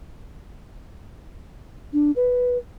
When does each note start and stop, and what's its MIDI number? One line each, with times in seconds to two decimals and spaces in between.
1.93 2.11 62
2.16 2.57 71